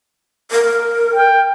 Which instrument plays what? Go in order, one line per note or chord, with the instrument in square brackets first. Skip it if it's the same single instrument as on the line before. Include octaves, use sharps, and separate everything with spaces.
[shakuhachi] A#4
[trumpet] G5